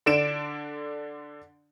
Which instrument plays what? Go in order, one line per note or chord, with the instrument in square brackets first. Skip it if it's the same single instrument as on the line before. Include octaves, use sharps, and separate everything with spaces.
[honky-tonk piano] D3 D4 D7 E7